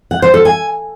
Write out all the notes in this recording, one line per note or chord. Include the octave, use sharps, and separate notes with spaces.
F#5
C5
A4
G#5